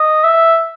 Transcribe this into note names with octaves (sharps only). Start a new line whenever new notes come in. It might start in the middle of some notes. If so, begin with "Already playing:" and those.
Already playing: D#5
E5